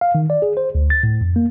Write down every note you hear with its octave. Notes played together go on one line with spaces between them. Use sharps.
F5
D#3
D5
G#4
C5
D2
A6
A2
F2
A#3